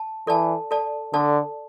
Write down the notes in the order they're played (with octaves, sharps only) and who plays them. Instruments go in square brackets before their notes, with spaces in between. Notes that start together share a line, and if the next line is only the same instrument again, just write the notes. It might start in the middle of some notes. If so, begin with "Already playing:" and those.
Already playing: [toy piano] A5
[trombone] E3 [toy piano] A4 D5 A5
[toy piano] A4 D5 A5
[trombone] D3 [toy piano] A4 D5 A5